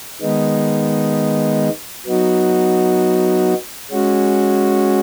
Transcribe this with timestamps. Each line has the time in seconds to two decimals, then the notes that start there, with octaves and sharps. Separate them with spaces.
0.21 D#3 G#3 B3 D#4
2.06 F#3 B3 D#4 F#4
3.91 G#3 C#4 F#4